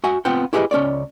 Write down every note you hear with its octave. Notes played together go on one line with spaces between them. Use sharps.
F#4 E5 F#5 G#5
B3 C4 F4 F#5 G5
E4 G4 G#4 B4 C5 D#5
C#2 C#4 C#5 D5